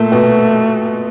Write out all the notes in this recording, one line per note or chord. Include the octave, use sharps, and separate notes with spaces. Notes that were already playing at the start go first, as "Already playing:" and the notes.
Already playing: A#2 A3 A#3
B2 B3